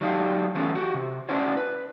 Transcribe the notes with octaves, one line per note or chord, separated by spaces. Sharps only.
F#3 D4 D#4 G4 F5
E3 F3 A3 B3 C#4
F#4 G4
C3
C#4 D4 E4 F#4 C5 C#5
B4